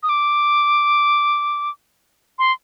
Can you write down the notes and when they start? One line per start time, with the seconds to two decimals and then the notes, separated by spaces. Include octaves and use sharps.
0.03 D#6
0.09 D6
2.39 C6